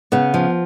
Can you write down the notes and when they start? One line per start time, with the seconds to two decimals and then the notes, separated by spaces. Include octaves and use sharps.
0.12 C#3 B3
0.34 F3